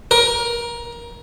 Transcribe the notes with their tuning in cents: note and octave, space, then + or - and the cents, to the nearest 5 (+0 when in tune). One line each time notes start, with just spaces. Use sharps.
A#4 +20